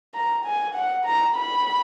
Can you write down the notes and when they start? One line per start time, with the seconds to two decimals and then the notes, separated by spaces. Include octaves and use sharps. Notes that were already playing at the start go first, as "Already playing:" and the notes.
0.14 A#5
0.45 G#5
0.75 F#5
1.05 A#5
1.36 B5